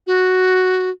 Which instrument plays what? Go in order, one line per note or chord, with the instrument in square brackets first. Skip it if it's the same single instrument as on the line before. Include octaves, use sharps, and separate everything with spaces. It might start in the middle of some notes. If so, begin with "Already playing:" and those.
[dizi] F#4